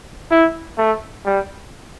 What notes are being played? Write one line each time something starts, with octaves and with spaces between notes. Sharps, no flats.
E4
A3
G3